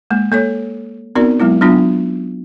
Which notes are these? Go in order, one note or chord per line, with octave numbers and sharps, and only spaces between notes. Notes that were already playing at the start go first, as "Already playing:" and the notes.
G#3 A#3
A#3 A4 C#5
B3 C4 D#4 F#4 A#4 D5
F#3 G#3 B3 E4
F#3 B3 D4 F4